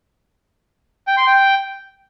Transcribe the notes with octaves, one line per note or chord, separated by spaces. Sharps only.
G5
C6
G5